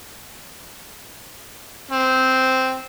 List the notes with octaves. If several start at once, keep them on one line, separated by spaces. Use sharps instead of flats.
C4